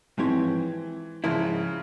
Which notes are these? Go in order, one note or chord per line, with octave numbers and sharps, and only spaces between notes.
G#2 E3 F3 C4 G4 C#5
G#2 C#3 F3 G#3 E4 A#4